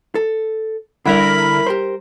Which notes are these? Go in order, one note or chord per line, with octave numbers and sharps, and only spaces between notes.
A4
D3 G3 D4 E4 A#4 F#5 B5
G4 A#4 C5